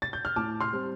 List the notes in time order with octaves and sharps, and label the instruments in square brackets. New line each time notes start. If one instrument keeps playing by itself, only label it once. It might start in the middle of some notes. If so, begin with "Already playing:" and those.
[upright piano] A6
G6
F6
A2 A5 D6
C6 F6
G3 C4